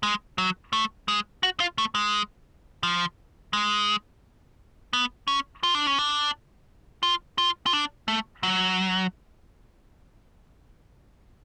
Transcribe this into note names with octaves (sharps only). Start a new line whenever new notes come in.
G#3
F#3
A3
G#3
F#4
F4
A3
G#3
F3
G#3
B3
C#4
F4
D4
C#4
D4
F4
F4
F4
D4
A3
F#3